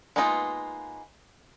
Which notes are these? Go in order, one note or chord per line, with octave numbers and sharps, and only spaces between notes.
G#3 A#3 B3 D#4 F4